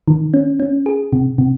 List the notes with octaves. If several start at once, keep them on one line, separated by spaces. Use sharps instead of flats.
D#3
C#4
C#4
G#4
C3
C3